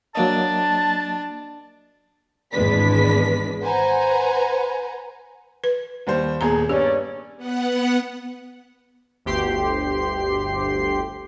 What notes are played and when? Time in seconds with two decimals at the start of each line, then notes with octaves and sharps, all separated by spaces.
0.15 F#3 A#3 D4 D#5 A5
2.53 G#1 E2 G#3 D4 B4 B6
3.62 B4 C5 F#5 G#5 A#5
5.64 B4
6.07 D#2 G3 C5
6.41 D#1 B3 G#4 A#5
6.69 G2 C#4 G4 D5
7.37 B3 F#5
9.26 G1 D2 G4 C6 C7